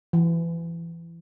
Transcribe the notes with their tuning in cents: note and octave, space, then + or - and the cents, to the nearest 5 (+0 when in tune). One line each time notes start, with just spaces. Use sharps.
E3 +25